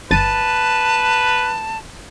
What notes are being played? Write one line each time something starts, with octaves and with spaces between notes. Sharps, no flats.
G1 B4 A5 A6 D#7